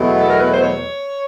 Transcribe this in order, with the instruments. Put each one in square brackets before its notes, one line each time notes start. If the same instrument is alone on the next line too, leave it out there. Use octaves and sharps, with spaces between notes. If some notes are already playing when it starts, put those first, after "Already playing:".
Already playing: [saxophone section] E2 B2 F#3 A3
A4
A#4
B4
C5
C#5